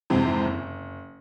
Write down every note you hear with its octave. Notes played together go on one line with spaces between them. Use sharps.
F2 G#2 C3 E3 C4
F#1